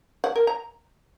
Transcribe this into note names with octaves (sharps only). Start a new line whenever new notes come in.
F#5
A#4
A#5